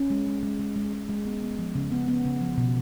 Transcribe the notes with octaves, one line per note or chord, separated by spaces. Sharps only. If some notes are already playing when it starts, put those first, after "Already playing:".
Already playing: C#4
G#3
G#3
G#3
G#3
G#3
G#3
G#3
B3
B3
F3
C#3
B3
B3
C#3
F3
B2